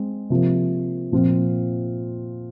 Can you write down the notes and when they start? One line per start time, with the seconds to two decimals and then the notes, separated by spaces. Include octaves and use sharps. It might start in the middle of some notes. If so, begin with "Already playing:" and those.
Already playing: G#3 C4
0.30 C3 F3 A#3
1.12 A#2 F3 C4 F4